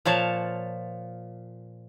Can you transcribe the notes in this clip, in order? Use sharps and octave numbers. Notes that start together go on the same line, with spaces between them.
A#2 F3 C#5 A5